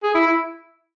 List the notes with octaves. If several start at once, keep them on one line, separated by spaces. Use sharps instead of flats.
G#4
E4
E4